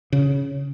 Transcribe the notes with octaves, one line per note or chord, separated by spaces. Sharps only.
C#3